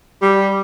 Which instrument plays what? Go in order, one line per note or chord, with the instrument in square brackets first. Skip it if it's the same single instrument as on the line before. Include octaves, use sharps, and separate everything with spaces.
[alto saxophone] G3